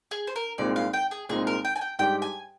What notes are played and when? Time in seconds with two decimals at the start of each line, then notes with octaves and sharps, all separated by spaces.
0.11 G#4
0.27 C5
0.36 A#4
0.58 C2 A#2 G#3 C4 D#4 D5
0.76 F5
0.93 G5
1.11 G#4
1.29 C2 A#2 G#3 C4 D#4 G#4
1.47 A#4
1.65 G5
1.76 G#5
1.81 G5
1.99 G#2 G3 D4 G4 G5
2.22 G#5